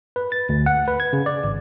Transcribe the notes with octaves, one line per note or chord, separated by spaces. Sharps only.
B4
A6
D2
F#5
B4
G#6
C#3
D5
G#1